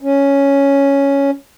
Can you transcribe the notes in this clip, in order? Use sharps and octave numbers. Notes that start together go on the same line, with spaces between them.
C#4